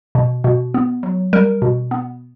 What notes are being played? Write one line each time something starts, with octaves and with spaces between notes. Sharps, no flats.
B2
B2
B3
F#3
G3 A#4
B2
B3